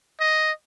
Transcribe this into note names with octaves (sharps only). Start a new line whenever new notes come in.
D#5